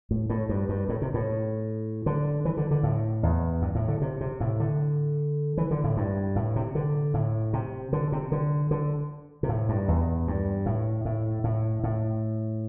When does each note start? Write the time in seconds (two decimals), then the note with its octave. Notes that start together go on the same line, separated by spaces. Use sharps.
0.11 A2
0.30 A2
0.49 G2
0.69 G2
0.89 A2
1.02 C3
1.14 A2
2.06 D3
2.45 E3
2.57 D3
2.71 D3
2.83 A2
3.23 E2
3.62 G2
3.75 A2
3.88 D3
4.02 C3
4.21 C3
4.40 A2
4.60 D3
5.57 E3
5.71 D3
5.84 A2
5.97 G2
6.36 A2
6.56 C3
6.75 D3
7.14 A2
7.53 C3
7.93 D3
8.12 C3
8.32 D3
8.71 D3
9.43 C3
9.49 A2
9.69 G2
9.88 E2
10.28 G2
10.66 A2
11.05 A2
11.44 A2
11.84 A2